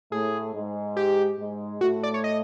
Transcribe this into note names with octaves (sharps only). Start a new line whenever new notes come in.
A2 A3 G#4
G#2 G#3
G4
G#2 G#3
A2 A3 F#4
D5
C#5
D#5